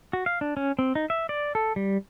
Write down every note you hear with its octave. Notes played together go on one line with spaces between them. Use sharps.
F#4
F5
D4
C#4
C4
D#4
E5
D5
A4
G3